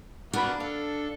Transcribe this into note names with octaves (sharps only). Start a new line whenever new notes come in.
A#3 B3 D4 F#4 B4 B5
A4 F5